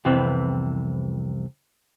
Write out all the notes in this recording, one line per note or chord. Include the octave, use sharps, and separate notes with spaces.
C2 F2 C3 E3 B3 C4